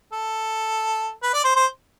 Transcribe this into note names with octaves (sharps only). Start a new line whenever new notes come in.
A4
B4
D5
C5
C5